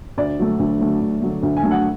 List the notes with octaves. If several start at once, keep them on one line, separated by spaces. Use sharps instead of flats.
D2 D5
D3 F#3 A3
D2
D3 F#3 A3
D2
D3 F#3 A3
D2
G#5
D3 F#3 A3
F#5